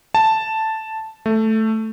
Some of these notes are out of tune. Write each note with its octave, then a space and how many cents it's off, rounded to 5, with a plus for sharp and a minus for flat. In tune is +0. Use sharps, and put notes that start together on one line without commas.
A5 +0
A3 +0